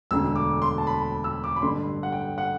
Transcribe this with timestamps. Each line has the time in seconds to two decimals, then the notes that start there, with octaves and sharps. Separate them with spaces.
0.11 E1 D2 D3 E6
0.36 D6
0.62 C6
0.78 A5
0.87 B5
1.24 E6
1.44 D6
1.56 B5
1.62 A1 G2 D3 C6
2.03 F#5
2.12 G5
2.38 F#5